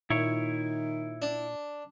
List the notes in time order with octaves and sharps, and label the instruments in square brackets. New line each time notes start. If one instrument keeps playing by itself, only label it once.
[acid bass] A#2 [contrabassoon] D#3 [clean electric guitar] E4 C#5
[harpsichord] D4